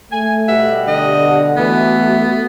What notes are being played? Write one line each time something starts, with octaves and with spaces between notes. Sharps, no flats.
A3 G#5
B2 G3 G4 E5 F#5
D3 D#5
E3 A3 B3 F#4